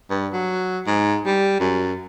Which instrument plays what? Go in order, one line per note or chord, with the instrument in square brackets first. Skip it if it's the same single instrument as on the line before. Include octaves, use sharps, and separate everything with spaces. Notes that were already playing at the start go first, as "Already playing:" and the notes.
[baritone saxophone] G2
F#3
G#2
G3
F#2